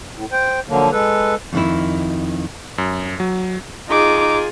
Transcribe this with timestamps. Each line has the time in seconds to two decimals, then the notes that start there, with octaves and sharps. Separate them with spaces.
0.15 A2
0.32 C5 G5
0.69 D3 F3 F#3 A#3
0.92 G#3 A4 B4
1.53 F2 D#3 E4
2.78 F#2
3.20 F#3
3.89 D#4 F4 G#4 D6